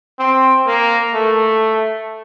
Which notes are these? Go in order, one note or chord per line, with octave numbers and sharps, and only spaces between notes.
C4
A#3
A3